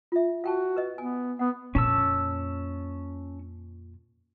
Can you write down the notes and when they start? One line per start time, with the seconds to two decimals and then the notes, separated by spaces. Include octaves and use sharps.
0.12 F4 E5
0.44 F#4 F5 G5 A5
0.76 B4 D#5
0.98 B3 G#5
1.39 B3 F#5
1.75 F2 A#2 C#4 A5 E6